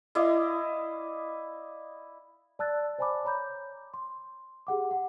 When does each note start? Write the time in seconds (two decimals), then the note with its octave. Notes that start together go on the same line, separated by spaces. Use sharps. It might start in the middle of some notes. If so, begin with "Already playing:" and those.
0.15 E4 D5 D#5 F5
2.59 D5 A5 E6 F#6 A6
2.98 C5 D5 G#5 A5 B5 D6
3.25 C#5 A#5 B5 D6 G6
3.94 C6
4.67 G4 G#4 F#5 D6
4.91 F#5